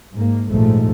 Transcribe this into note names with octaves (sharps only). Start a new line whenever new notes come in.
G#2 A#3
A#1 D#2 G#2 F3 A3